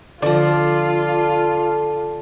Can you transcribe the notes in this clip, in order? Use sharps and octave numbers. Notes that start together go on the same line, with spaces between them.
D3 F3 F4 A4 D5